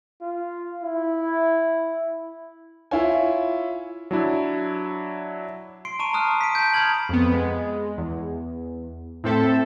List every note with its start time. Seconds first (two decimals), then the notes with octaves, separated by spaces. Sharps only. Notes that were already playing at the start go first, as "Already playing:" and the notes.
0.21 F4
0.84 E4
2.91 E4 F4 C#5 G#5
4.11 F#3 D4 E4
5.85 C6 C7 D7
5.99 A5 A#5 C#6 D#7
6.13 A5 A#5 D#6 F6 F#6
6.41 B6 D7
6.55 A5 G6
6.74 A#5 B5 D#6 F6 G#6 F#7
7.09 F2 B3
7.34 G#3
7.98 E2
9.24 A2 C4 A4 E5